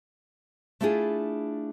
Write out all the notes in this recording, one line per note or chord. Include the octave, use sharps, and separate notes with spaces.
A3 D4 E4 F4 G#4